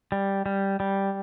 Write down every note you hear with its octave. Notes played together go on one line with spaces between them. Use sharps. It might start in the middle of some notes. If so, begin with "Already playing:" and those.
G3
G3
G3